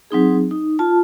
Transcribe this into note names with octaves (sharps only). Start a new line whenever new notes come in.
F#3 C4 D#4 G#4
D#4
F4 A5